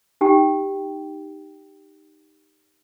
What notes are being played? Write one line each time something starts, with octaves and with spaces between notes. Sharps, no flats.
D#4 G4 G5